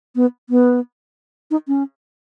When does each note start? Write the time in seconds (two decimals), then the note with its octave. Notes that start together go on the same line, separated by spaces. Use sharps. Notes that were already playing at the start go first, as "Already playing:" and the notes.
0.16 B3
0.50 B3
1.51 D#4
1.68 C#4